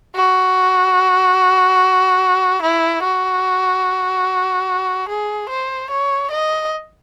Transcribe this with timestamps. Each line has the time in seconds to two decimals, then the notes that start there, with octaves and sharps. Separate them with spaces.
0.16 F#4
2.62 E4
3.03 F#4
5.09 G#4
5.49 C5
5.91 C#5
6.31 D#5